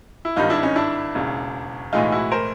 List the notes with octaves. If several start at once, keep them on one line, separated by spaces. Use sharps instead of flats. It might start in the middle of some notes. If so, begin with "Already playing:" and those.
E4
G#1 G2 D#3 G3 D#4 F4
D4 E4
C#4 D#4
D4 E4
E1 D#2 C#3
B1 A2 E3 G#3 D#4 F4
E4 F#4
A#4 C5